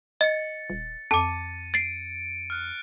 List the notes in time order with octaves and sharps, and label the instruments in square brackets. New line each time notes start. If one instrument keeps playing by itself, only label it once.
[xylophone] D#5 [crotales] A6 C#7
[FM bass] D#1
[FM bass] F2 [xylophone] A5 D6 [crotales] C#7 D#7
[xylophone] A6 C7 [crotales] D7
[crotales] F6 F#6